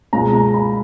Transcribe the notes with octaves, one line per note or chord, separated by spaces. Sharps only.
C#2 B2 G#3 A#5
A#5
B5